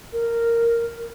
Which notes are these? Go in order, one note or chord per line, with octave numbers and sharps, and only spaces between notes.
A#4